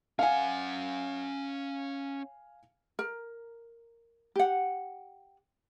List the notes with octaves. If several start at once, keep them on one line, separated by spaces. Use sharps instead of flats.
C#4 F5 F#5 G#5
A#4
G4 F#5